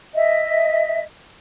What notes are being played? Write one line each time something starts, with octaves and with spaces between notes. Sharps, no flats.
D#5 E5